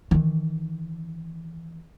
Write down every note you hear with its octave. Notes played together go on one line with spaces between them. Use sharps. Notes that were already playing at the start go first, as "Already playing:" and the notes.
D#3 E3